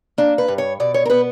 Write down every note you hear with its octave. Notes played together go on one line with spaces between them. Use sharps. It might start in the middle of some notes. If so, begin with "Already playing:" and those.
A#3 D4
B4
G2
C#5
B2 D5
C#5
A#4
B3 B4